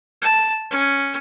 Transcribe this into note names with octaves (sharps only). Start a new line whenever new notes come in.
A5
C#4